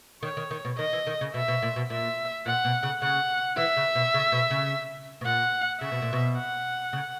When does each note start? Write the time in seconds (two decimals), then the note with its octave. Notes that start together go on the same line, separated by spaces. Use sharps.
0.23 D#3 C#5
0.37 D#3
0.51 D#3
0.65 B2
0.78 D#3 D#5
0.93 E3
1.07 D#3
1.21 C#3
1.34 B2 E5
1.48 B2
1.62 A#2
1.76 B2
1.90 A#2 E5
2.46 A#2 F#5
2.65 B2
2.83 C#3
3.02 C#3 F#5
3.57 E3 E5
3.76 C#3
3.95 B2
4.14 C#3
4.32 B2
4.50 C#3
5.21 B2
5.25 A#2 F#5
5.81 C#3 E5
5.92 B2
6.02 A#2
6.13 B2
6.37 F#5
6.93 C#3